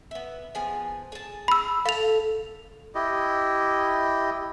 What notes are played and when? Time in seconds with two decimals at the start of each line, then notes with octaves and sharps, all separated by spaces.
0.11 B3 E5
0.55 F3 B3 G#4
1.12 G#4 A5
1.48 B5 E6
1.86 A4 F5 F7
2.95 E4 G4 D#5